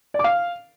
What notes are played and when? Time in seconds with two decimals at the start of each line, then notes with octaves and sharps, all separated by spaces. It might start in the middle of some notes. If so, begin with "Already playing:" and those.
0.14 D5
0.19 D6
0.24 F5